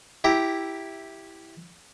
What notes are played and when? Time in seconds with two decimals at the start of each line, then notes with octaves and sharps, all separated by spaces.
0.24 E4 G4 A#5